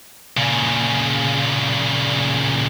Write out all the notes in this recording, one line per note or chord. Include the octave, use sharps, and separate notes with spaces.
A#2 C#3